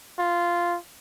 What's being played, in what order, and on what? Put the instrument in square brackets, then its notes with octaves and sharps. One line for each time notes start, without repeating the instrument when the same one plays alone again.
[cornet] F4